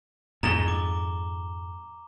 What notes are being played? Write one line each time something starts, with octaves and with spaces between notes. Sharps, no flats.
F2 G#2 A#5 E7 G7
D6